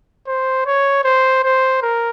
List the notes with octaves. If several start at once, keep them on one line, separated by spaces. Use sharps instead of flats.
C5
C#5
C5
C5
A#4